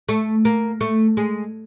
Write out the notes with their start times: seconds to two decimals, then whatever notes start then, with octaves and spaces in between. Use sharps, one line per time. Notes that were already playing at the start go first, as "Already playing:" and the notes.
0.09 A3
0.45 A#3
0.81 A3
1.17 G#3